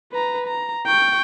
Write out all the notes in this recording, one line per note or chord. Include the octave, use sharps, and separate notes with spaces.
B4 A#5
A#5
G5 C#6